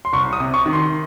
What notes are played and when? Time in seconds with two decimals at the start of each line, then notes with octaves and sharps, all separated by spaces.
0.05 C6
0.13 C2 C#6
0.33 D#6
0.40 C3
0.54 C#6
0.66 D#3
0.73 C6